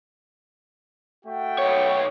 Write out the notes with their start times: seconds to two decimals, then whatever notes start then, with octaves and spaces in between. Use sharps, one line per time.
1.26 A3 F#4 G5
1.58 B1 C#5